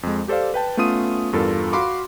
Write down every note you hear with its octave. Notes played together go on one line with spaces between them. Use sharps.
F2 G#3
G4 A4 C5 D5 F5
B4 G5 A5
A3 B3 C#4 F4 D#6 D#7
E2 G2 F4 A4 A#4
F#4 F5 B5 C6 D6